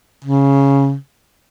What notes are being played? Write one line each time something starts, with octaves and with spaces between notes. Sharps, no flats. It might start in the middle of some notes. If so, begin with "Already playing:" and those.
C#3